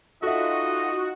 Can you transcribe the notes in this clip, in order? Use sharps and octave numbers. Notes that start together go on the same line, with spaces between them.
D#4 F4 F#4 A4 D#5 E5